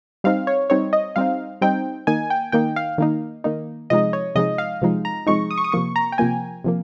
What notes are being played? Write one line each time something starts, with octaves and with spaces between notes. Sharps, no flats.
G3 C4 D#4 F5
C#5
G3 C4 D#4 C#5
D#5
G3 C4 D#4 F5
G3 C4 D#4 G5
D#3 A#3 D#4 G#5
G5
D#3 A#3 D#4 G5
F5
D#3 A#3 D#4
D#3 A#3 D#4
C3 F3 G#3 D#4 D#5
C#5
C3 F3 G#3 D#4 D#5
F5
C3 F3 G#3 D#4
A#5
C3 F3 G#3 D#4 C#6
D#6
C#6
D#6
C3 F3 A#3 C#6
A#5
G5
C3 F3 A#3 G#5
C3 F3 A#3